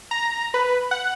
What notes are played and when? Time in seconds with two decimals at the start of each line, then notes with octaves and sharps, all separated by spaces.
0.11 A#5
0.54 B4
0.91 F#5